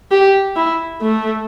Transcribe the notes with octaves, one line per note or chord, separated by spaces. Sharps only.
G4
E4
A3